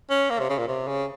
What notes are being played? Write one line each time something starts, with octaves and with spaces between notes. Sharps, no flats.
C#4
A#3
C3
C#3
A#2
C3
C#3